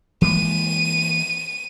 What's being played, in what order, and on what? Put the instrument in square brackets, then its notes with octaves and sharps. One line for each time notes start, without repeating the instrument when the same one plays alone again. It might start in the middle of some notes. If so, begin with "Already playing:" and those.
[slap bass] E3 G#3 A#3 [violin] D#7